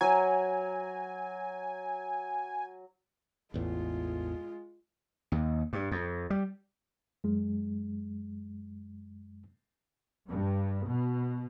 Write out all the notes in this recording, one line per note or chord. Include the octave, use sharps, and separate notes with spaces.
F#3 G#5
A1 E2 A2 G#3 F4
D#2
G2
F2
G3
F#2 G#3
G2
B2